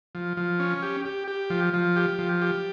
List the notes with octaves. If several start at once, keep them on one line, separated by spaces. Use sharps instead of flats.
F3
F3
C#4
G4
G4
G4
F3
F3
G4
F3
G4